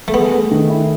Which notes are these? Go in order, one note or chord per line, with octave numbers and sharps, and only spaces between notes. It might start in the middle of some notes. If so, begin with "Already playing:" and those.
A3
B3 G#4
A3
D#3
E4